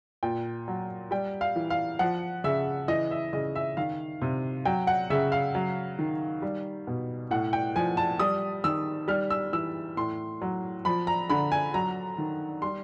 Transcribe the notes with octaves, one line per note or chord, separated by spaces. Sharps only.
A#2 G5
F#3
G3 G5
F5
E3
F5
F3 F#5
C#3 E5
E3 D#5
E5
C#3 D#5
E5
D#3 F5
C3
F#3 G5
F#5
C#3 E5
F5
F#3
D#3
G3
B2
A2 F#5
G5
F3 G#5
A5
G3 D#6
D#3 E6
G3 F6
E6
E3 E6
A2 C6
F#3
F3 B5
A#5
D3 B5
G#5
F#3 A#5
D#3
G3 C6